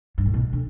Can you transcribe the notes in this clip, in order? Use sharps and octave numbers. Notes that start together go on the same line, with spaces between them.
G2
A2
B2
D3